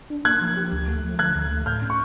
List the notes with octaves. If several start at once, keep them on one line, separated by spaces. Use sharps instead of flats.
D4
A#3 F#6 G#6
F3
G4
D2
A3
F3
D3 F#6 G#6
D2
A3
A2 F6 G6
C#4
C#6